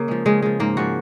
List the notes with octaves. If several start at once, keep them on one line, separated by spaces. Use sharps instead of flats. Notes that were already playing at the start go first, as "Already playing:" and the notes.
Already playing: C#3 A#3
F3 G#3
C#3 G#3
F3 G#3
G#2 A#3
F3 G#3 F#4